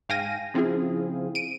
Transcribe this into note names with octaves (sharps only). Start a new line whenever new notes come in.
G#2 F5 G5 G#5 A#6 D#7
C#3 F3 C4 E4 F4 G#4
D7 D#7